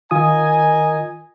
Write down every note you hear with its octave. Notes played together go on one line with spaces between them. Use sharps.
D#3 F4 A#4 D#5 G#5 D#6